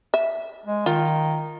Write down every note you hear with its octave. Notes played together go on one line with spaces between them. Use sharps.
E5
G#3
D#3 F4